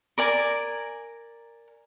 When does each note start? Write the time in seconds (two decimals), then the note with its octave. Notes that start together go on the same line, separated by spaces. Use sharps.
0.18 A#4 D5 G#5 A#5